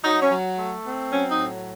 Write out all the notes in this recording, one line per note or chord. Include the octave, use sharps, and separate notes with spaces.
F#3 D#4
C#4
F#3
A3
C4
F#3 C#4
D#4
A2